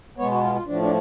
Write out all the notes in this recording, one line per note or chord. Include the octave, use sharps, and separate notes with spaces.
B2 G#3 B3 C#5
F#4
F4
F4
A2 F3 A3 D4
D4